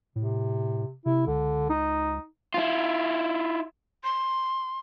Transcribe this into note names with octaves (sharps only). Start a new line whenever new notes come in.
A2 C3
C3 E4
C#2 D3
D#4
E4 F4
C6